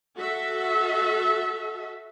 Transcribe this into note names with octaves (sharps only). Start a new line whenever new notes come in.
F#4 A4 E5